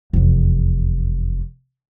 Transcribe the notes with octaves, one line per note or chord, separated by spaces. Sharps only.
F1 E2